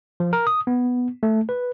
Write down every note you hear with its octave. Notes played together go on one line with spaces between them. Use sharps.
F3
A#4
D#6
B3
A3
B4